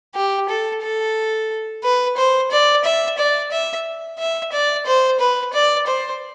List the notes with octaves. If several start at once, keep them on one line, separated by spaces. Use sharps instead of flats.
G4
A4
A4
B4
C5
D5
E5
D5
E5
E5
D5
C5
B4
D5
C5